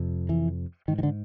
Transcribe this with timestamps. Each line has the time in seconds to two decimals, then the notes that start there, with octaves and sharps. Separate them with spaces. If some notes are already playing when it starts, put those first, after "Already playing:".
Already playing: F2 C3
0.29 E3
0.88 G#2 D#3
0.98 D#3
1.03 D3